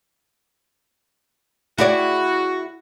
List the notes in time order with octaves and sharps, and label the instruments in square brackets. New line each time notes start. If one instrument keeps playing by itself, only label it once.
[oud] E4 G#4 D5 [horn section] F#4